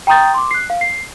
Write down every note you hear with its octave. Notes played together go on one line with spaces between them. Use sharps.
G5 A#5 C6 D#6 G6 A6
C6 D6
F#6 C7
F5
C7